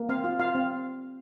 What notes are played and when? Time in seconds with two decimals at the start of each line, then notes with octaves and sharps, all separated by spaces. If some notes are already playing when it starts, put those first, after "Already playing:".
Already playing: A#3
0.09 C4 F5
0.24 F4
0.39 F4 F5
0.55 C4